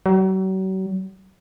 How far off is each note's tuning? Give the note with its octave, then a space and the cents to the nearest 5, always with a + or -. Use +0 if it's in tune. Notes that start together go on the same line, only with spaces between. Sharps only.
F#3 +40